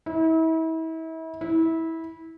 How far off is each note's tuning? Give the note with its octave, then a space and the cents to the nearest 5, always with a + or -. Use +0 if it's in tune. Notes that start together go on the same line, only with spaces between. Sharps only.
E4 -35
E4 -20